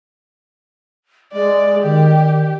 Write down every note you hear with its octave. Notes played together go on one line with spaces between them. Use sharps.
G#3 D5
D#3 G4